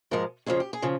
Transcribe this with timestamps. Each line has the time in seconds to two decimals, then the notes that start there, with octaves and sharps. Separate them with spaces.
0.11 G#2 F3 G#3 A#4
0.46 F2 C#3 F3 G#4
0.60 G4
0.73 G#4
0.82 C#3 F3